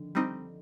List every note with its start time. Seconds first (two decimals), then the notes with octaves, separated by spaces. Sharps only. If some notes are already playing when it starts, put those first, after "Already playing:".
Already playing: D3 D#3 F3
0.15 G3 C4 D#4